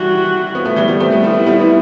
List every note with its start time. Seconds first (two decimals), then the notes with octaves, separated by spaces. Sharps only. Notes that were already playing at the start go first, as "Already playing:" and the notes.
Already playing: E3 G3 F#4
0.55 B3
0.65 A3
0.76 E3 G3
0.88 G3 B3
1.00 A3 C4
1.12 G3 B3
1.23 G3 B3 E4
1.46 G3 B3